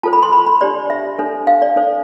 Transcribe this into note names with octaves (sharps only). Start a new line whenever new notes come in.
F4 A4 C5 A5
B5
C6
B5
B5
D4 G4 C5 D5
E5
D4 A4 C5
F5
D5
D4 A4 C5